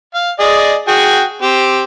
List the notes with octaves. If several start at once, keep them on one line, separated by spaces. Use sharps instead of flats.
F5
G#4 D5 D#5
F#4 G#4 G5
C4 G4